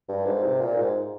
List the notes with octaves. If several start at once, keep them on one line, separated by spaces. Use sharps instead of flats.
G2
G#2
C3
A#2
G#2